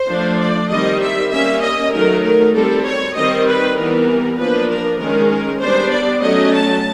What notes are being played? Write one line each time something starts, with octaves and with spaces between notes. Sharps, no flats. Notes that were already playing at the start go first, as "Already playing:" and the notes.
Already playing: C5
F3 A3 D4
D5
D#3 G3 C4 D#5
E5
G3 A#3 C#4 E5
D#5
D#3 F#3 A3 A#4
A#4
G3 C4 A4
C#5
D#3 G3 C4 D#5
B4
E3 G3 B3 A#4
F3 A#3 D4 B4
A#4
D#3 G#3 C#4 A#4
A#4
G3 B3 D4 C5
D5
F#3 A3 C#4 D#5
A5